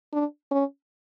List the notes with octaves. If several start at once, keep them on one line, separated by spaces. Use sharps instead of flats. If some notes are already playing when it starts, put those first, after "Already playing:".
D4
C#4